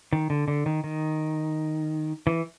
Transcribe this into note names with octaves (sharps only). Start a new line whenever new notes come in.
D#3
D3
D3
D#3
D#3
E3